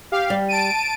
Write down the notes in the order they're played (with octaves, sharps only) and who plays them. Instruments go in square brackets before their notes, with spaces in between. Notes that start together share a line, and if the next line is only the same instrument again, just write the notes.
[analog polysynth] G4 F5
[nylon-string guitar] G3
[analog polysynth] A5 D7 D#7